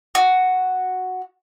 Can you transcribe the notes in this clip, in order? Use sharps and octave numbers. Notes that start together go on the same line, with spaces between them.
F#4